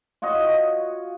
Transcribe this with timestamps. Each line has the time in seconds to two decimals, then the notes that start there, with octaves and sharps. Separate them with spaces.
0.22 F4 F#4 C#5 D#5